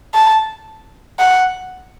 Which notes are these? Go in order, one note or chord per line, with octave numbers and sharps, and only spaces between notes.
A5
F#5